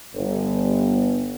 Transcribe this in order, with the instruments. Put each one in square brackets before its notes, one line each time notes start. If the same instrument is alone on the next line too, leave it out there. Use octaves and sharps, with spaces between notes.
[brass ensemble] G1